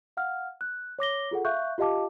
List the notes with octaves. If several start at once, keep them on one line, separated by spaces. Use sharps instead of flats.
F5 F#5 F6
F#6
C#5 D6 A#6 G7
F4 G#4 A4 F#5
E5 F5 C#6 F#6 G6
F4 G4 D#5 F5 A5 D6